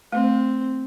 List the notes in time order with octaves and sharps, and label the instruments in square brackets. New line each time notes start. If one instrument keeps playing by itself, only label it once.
[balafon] A3 [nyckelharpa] C4